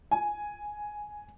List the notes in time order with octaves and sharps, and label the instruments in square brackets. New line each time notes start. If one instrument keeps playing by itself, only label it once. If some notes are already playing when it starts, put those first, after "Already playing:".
[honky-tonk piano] G#5